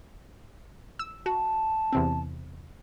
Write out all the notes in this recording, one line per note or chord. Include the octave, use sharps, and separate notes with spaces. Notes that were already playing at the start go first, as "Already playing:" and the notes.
E6
F#4 A5
E2 C3 C4